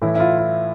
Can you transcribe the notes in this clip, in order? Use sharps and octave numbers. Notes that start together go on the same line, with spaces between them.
A2 E3 E4
E4
F4
F4